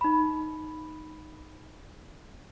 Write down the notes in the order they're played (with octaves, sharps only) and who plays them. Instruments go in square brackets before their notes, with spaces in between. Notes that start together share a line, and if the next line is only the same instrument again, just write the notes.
[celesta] D#4 B5